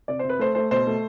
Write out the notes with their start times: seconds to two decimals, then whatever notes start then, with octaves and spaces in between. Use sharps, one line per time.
0.08 C3 D5
0.19 C3 C5
0.29 B4
0.39 A3 C5
0.55 A3 C5
0.71 B2 C5
0.87 A3